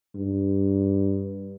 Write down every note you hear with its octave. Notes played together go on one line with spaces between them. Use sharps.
G2